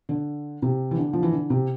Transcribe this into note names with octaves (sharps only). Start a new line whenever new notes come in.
D3
C3
E3
D3
F3
E3
D3
C3